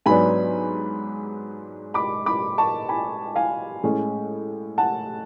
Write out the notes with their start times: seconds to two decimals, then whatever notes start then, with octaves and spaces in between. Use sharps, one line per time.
0.06 G#2 F#3 B3 D4 G#5 B5
1.94 B5 D6
2.26 B5 D6
2.58 A5 C#6
2.89 G#5 B5
3.36 F5 G#5
3.84 A2 G#3 C#4
4.78 F#5 A5